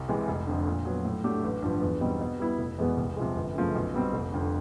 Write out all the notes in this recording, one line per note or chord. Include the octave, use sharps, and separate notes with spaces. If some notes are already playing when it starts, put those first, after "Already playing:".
Already playing: C2
C3 E3 G#3 C4
F1
F2 D3
A#2
F#3 B3
A2
F#3 A3 D4 G4
A1
G2 D3 F3
E2
B2 G3 C4 D#4
B2
G3 B3 E4
F1
E2 B2 G#3 B3
C2
C3 F3 G#3
G1
F#2 C#3 F3 A3
B1
B2 G3 C4
F1
F2 D3